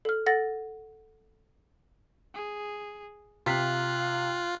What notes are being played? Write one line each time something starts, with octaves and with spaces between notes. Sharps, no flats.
A4 F6
A4 F#5 A6 A#6
G#4
C3 F4 F5 F#6 B6 C7